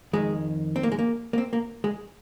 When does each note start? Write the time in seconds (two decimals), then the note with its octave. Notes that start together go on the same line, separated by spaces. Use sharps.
0.13 F2 D#3 G#3
0.76 C4
0.83 A#3
0.92 G#3
0.99 A#3
1.33 A#3
1.38 C4
1.53 A#3
1.84 G#3